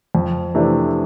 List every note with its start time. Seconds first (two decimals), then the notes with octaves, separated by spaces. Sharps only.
0.15 F2
0.55 C3 E3 A3 D4